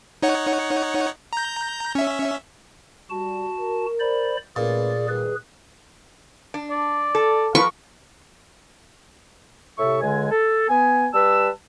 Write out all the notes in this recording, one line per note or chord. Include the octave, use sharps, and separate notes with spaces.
D#4 C#5 F#5
A#5 G6
C#4 E5
G3 F#4 A5
A#4
C5 D5 B5
A#2 A3 C#4 G#4 B4 D5
D#3 G3 G#3 G#4 B4
D4
D5
A4
F3 A#4 B4 C#6
A2 C3 A4 E5 C#6
C#2 D3 G#3 G#5
A4
B3 G#5
G3 B4 A5 E6